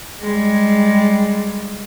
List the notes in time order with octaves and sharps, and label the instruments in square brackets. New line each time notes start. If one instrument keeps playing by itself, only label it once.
[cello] G3 G#3